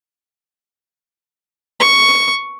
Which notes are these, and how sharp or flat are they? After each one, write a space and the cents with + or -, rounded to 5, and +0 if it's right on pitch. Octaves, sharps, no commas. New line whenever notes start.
C#6 +5